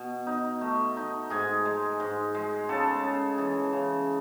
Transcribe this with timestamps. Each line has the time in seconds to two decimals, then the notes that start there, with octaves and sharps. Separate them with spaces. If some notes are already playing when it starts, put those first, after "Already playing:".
Already playing: B2
0.27 D#4
0.61 A3
0.97 D#4
1.30 G#2 G#4 G#5
1.65 G#3
2.00 G#2
2.35 G#3
2.69 C#3 A4 A5
3.04 C#3
3.38 E3
3.73 C#3